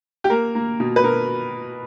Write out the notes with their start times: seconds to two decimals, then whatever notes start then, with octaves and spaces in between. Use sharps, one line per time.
0.24 G4
0.30 A#3 A#4
0.55 A#3
0.80 B2
0.96 B4
1.03 B2 A#4